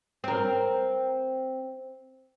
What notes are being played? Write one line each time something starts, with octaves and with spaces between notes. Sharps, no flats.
C4 A#4